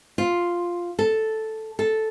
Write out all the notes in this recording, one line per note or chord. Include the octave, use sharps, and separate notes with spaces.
F4
A4
A4